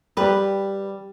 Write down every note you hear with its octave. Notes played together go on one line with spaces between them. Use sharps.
G3 G4 B4